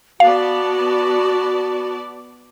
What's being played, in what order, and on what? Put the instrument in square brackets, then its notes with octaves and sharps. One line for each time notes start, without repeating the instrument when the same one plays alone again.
[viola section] B3 D5 A5 [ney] F#4 [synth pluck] F5